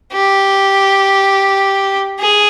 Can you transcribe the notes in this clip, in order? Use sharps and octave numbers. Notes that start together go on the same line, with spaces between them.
G4
G#4